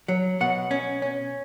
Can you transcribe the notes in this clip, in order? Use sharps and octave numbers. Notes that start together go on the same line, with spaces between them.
F#3
B2 F#5
C#4
C#4